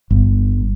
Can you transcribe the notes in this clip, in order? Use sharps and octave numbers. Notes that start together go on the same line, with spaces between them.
G1